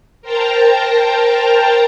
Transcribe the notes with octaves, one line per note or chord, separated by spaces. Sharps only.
A#4 C5 G5 A5 A#5